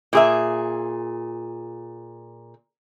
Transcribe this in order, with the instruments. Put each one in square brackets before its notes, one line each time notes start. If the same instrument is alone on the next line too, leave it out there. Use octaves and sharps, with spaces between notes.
[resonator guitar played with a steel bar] A#2 G#4 E5